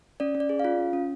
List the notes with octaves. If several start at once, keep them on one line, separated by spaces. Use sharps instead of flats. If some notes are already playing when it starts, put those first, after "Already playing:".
C#4 D5
C#4
D5
G#4
F5
F4
C#4
C#4